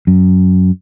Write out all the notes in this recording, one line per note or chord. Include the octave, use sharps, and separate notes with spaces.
F#2